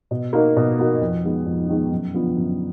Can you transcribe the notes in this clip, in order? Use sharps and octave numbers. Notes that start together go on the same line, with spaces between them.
B2
A#3 D#4 F#4
B2
A#3 D#4 F#4
F2
D#3 G#3 B3
F2
D#3 G#3 B3
F#2
D3 F3 B3 F4
F#2